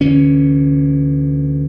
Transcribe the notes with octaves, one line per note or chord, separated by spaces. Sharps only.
D2 D3 E3 C#4